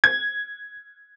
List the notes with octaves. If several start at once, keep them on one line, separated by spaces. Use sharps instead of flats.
G#6